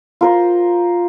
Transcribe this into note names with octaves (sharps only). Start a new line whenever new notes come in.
F4 A#4 C5